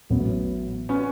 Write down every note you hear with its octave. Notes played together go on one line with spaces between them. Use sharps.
A1 A2 F#3 B3
B3 C#4